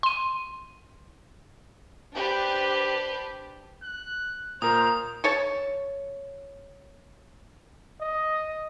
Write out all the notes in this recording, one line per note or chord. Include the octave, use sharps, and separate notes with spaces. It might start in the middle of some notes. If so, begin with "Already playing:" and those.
C6 D#7
D4 G4 B4 C5
F#6
A#2 A#4 C5 A#5 D#6
A4 C#5 A5
D#5